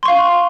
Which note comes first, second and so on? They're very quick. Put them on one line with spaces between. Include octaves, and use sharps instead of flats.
C6 C#6 F5